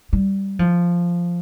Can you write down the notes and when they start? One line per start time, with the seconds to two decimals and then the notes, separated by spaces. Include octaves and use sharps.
0.13 G3
0.59 F3